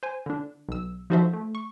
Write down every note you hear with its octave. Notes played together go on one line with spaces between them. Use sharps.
C5 G#5
D3 D4
B1 E6
F3 D#4 F#4 A4 C5 E5
A3
C#6